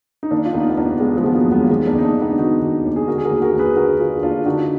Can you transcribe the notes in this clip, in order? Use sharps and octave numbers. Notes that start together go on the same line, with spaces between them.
D#4
D#3 A#3 D4
F4
D#2 B3 D#4
B3
D#2 A#3 D4
D#3 G#3 B3
F3 G#3
D#3 B3
F#3 A#3
D#2
G#3 B3
A#3
D#3 G#3 B3
A#3 D4
D#2
D#4
A#3 D4
D#2
B3 D#4
D#3 D#4 F#4
D#3
D#2
G#4
D3 F#4 A#4
G#4
F#4 A#4
D#2
F#4 A#4
D#2
G#4 B4
D3 F#4 A#4
D3 F4 G#4
D#2 D4 F4
D3 D#4 F#4